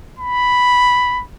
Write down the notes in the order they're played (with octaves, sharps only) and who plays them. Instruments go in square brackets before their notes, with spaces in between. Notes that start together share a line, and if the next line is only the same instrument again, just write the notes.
[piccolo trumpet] B5